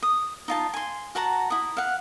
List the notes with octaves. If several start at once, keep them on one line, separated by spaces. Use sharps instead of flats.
D#6
D#4 F4 A5
G#5 C6
F#4 F#5 A5 A#5
E4 D#6
F5 F#5